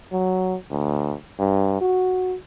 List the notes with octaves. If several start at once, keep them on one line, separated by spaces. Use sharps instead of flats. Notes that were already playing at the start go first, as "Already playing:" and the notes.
F#3
D2
G2
F#4